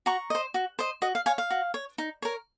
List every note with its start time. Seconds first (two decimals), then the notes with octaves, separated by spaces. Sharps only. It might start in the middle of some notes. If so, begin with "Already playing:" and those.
0.06 F#4 A#5 C#6
0.30 C5 D#5
0.54 F#4
0.79 C5 D#5
1.02 F#4 D#5
1.15 F5
1.26 C#5 F5 G#5
1.38 F5
1.50 F#4
1.74 C#5
1.98 D#4
2.22 A#4 C#5